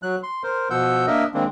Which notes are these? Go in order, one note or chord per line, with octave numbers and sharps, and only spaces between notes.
F#3 F#6
C6
A#4 C5
B2 F3 F#5 E6 G6
A#3 D4 A#4 D#5 E5
D#3 G#3 A#3 C4 D4